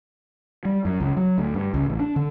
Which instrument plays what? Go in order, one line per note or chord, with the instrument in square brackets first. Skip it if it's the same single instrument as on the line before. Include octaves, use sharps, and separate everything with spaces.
[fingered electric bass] G3
F#2
C#2
F#3
D2
G2
C#2
A1
D4
D3